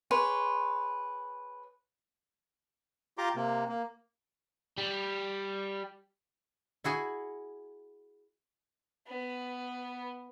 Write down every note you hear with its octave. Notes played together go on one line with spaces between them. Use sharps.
G#4 B4 C#5 C6
F4 G4 A#5 C6 D6
C3 A#3
A#3
G3
E4 F#4 G#4 G#5
B3